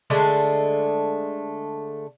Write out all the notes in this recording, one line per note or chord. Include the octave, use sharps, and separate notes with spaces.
D3 G#3 A3